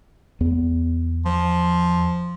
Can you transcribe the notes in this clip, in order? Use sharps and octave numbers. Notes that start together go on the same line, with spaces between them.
E2 B3
F3